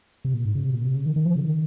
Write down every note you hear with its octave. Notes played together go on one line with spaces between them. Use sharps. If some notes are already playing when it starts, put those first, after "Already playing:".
C3
A#2
G#2
C#3
C3
A#2
C3
C#3
D#3
D#3
F3
C#3
D#3